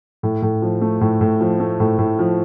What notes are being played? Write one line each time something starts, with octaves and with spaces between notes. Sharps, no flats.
A2
A2
F3
A3
A2
A2
F3
A3
A2
A2
F3